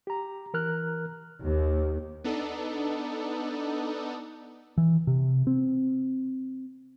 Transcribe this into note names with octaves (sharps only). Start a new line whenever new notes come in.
G4 A#5
E3 A#4 A#5 F6 F#6
D#2
B3 D4 D#4 A4
E3
C3
C4